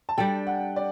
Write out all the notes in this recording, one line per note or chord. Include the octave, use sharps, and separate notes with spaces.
A5
G3 D4 A4 G5
F#5
D5